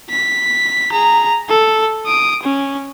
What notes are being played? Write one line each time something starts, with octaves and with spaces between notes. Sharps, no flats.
B6
G#4 A#5
A4
D#6 D7
C#4